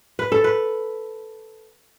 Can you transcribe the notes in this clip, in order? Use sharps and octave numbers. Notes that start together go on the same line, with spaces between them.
B4
A4
B4